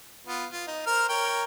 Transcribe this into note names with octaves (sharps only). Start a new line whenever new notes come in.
B3 F4
F4
D#4
A#4 C5 F6
A#4 C#5 G5